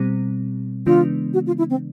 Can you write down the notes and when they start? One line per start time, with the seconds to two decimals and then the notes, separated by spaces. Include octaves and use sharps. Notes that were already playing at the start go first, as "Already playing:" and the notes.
Already playing: B2 G3 C4
0.86 C#3 E3 G#3 B3 D4 F4
1.34 F#4
1.47 F4
1.58 E4
1.70 C4